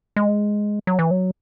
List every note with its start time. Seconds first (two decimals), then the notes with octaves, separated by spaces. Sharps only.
0.16 G#3
0.87 F#3
0.99 E3
1.11 F#3